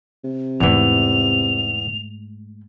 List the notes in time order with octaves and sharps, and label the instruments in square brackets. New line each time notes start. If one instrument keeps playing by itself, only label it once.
[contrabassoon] C3
[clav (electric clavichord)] E2 E3 [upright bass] G#2 A3 [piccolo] F7